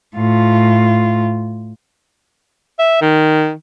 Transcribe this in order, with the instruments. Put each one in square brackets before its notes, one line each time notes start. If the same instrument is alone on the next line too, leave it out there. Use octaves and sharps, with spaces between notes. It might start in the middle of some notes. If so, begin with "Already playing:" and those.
[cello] A2 F4
[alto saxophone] E5
D#3